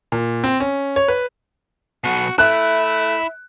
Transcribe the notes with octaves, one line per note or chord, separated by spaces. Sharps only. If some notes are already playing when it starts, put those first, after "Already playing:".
A#2
C4
C#4
C#5
B4
B1 B2 F#4
A3 E4 E5 F#6